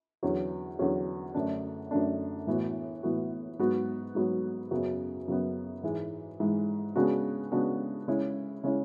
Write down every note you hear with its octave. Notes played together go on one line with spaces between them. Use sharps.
E2 D3 F#3 C#4
E2 D3 F#3 C#4
F#2 D3 A3 D4
F#2 D3 A3 D4
A2 E3 B3 F#4
A2 E3 B3 F#4
G#2 F#3 B3 F#4
G#2 F#3 B3 F#4
F#2 C#3 F#3 B3
F#2 C#3 F#3 B3
G#2 E3 G#3
G#2 E3 G#3
C#3 G#3 B3 D4 F#4
C#3 G#3 B3 D4 F#4
C#3 G#3 C#4 E4
C#3 G#3 C#4 E4